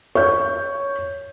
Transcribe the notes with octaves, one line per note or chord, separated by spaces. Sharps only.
C#5 G6